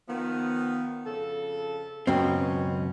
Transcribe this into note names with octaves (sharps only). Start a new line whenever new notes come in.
D#3 F3 B3
F2 C#3 A4
C#2 F#2 B2 C4 C#4